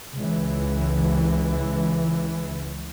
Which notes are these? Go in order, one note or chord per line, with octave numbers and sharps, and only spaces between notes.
C#2 E3